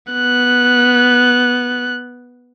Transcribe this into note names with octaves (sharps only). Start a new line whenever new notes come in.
B3 F#6